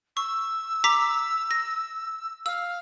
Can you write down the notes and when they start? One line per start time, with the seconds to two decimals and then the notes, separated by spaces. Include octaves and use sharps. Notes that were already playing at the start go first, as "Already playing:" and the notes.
0.17 C#6 E6
0.84 A#5 D6 B6
1.51 A#6
2.46 F5 E6